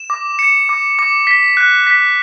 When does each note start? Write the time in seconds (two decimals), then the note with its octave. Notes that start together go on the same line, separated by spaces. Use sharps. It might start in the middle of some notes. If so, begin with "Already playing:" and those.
Already playing: E7
0.10 D6
0.39 C#7
0.69 D6
0.99 D6
1.27 B6
1.57 F#6
1.87 B6